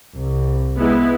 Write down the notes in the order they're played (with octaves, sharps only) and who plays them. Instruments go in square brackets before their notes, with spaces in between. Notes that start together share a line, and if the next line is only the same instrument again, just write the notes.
[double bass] C2
[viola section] G#3 B3 E4